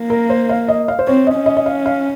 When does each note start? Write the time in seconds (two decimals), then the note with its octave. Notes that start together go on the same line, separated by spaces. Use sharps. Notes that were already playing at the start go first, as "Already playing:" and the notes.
Already playing: A#3
0.10 A#4
0.30 C5
0.49 F5
0.68 D#5
0.88 F5
0.99 C5
1.07 C4 C#5
1.27 D#5
1.36 C#4
1.46 D#5
1.57 D#5
1.66 F5
1.86 F5